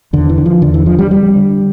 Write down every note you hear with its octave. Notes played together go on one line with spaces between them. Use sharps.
E2 D3
E3
D3
F3
E2 D3
E3
D3 F3
G3
F2 G3
D3